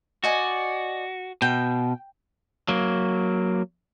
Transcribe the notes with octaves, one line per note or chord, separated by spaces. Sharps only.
F#4 D5 D#5 G#5
B2 G5
F#3 A#3